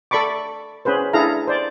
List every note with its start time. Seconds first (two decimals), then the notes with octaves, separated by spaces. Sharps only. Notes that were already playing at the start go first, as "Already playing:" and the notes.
0.11 A4 D5 B5 C#6 D6
0.85 C#4 G#4 B4 C5
1.13 D4 E4 G#4 A4 F5 A#5
1.47 C5 D5